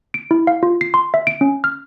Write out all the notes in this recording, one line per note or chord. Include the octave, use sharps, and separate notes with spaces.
D7
E4
F5
F4
C7
C6
E5
D7
C#4
F6